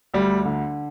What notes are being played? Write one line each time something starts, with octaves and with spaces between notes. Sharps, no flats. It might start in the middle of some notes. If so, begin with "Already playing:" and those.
D2 G3
D3